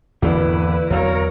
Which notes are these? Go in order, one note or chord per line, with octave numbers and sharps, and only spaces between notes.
G#1 E2 D3 E3 A#3 E4 B4 D5
E2 F#3 A#4 C#5 F5